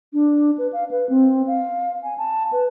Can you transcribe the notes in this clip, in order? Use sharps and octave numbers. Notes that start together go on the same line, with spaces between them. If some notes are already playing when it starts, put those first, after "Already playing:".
D4
B4
F5
B4
C4
F5
G#5
A5
B4